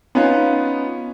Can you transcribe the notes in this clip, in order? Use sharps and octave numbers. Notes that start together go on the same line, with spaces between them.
B3 C#4 D#4 F4